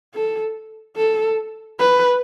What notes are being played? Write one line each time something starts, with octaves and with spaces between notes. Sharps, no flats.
A4
A4
B4